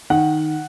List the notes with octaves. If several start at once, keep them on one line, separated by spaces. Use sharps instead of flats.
D#3 F#5